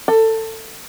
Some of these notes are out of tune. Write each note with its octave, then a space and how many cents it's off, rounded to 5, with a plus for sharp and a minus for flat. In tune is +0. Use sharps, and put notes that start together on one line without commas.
A4 +20